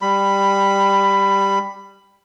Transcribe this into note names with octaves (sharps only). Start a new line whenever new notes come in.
G3 B5